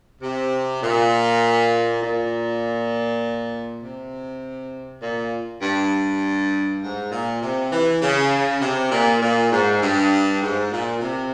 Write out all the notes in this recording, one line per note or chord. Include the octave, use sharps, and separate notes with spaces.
C3
A#2
A#2
C3
A#2
G2
G#2
A#2
C3
E3
C#3
C3
A#2
A#2
G#2
G2
G#2
A#2
C3